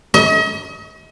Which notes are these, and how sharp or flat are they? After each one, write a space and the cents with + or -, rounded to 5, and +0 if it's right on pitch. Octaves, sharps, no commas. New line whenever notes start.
D#5 +40